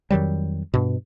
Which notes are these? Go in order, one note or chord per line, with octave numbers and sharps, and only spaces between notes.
F2 D#3 F#3 G3
G2 B2